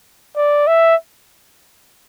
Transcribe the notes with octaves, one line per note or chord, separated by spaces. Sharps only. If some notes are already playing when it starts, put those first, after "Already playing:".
D5
E5